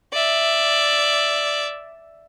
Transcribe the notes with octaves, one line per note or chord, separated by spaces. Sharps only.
D5 E5